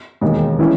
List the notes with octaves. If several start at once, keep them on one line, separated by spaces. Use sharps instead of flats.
E1 D#2 D#3 G#3
E3 G#3 C#4 E4